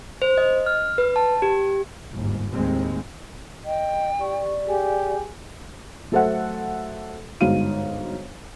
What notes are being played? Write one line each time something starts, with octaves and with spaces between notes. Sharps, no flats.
C5
D#5
F6
B4
A5
G4
G1 D#2 G#2
D#2 A2 D#3 G#3 C4
D#5 G5
G4 D5 C#6
G4 G#4 G#5
F#3 A3 A4 C5 E5 F#5
G1 G#2 F#4 F5 D#7